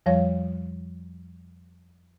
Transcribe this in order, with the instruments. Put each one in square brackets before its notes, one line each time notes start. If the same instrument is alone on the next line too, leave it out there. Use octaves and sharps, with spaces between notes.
[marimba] F2 F3 G3 C#5 F5